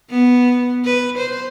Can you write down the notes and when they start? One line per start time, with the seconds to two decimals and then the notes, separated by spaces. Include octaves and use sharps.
0.10 B3
0.85 B4
1.18 C5